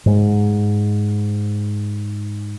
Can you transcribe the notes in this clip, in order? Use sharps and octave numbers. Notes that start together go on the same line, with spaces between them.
G#2 G#3